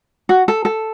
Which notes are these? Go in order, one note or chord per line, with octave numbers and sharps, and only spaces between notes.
F#4
A4
A4